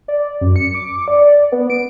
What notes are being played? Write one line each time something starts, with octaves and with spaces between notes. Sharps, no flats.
D5
F#2
C#7
D6
D5
D5
B3
D7